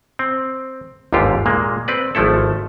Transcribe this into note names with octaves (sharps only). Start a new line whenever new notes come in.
C4
G1 D#2 G#2 D3 F4 G4
A#2 G#3 A#3
C4 B4 D5
G#1 F3 A3 E4 A4